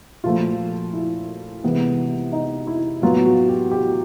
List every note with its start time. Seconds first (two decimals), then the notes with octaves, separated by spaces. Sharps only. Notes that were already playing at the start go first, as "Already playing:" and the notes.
0.24 A#2 F3 A3 F4
0.93 E4
1.64 C3 E3 G#3 B3
2.32 D#4
2.67 E4
3.02 A2 F#3 B3 F4
3.25 F#4
3.49 G4
3.71 G4